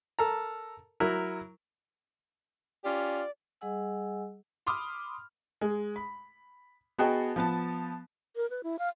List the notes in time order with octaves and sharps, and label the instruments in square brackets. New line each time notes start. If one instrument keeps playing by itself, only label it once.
[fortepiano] A4 A#4 A#5
F#3 E4 A#4
[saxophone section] C#4 F4 G4 [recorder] D5
[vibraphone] G3 G#4 D#5 F#5 G#5 E6
[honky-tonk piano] B5 C6 D6 D#6 F6
[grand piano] G#3
B5
B3 F#4 G#4 D#5 G5 A5
F3 B3 A5
[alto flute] A#4
B4
E4
F5